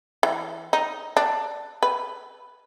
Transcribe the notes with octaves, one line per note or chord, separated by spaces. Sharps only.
E3
D#4
D4
B4